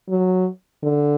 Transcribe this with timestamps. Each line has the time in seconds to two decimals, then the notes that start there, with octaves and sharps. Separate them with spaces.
0.09 F#3
0.83 D3